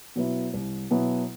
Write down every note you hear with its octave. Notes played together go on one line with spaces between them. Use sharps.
B2 F#3 B3 E4
C2
B2 F#3 B3 E4